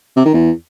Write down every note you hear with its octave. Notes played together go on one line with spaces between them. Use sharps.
C3
D#3
E2